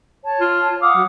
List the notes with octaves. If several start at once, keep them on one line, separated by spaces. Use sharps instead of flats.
C#5 A5
F4
F5 F#5 D6 D#6
F#3